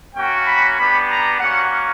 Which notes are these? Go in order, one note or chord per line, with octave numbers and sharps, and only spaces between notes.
A#3 C#4 F#4 G5
B5
B3 D4 G4 B5
A#5
A#3 C#4 F#4 F#5